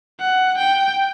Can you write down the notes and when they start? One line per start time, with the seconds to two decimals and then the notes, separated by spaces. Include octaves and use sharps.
0.20 F#5
0.57 G5